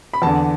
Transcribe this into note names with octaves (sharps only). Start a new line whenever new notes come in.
B5
E2 D3 A5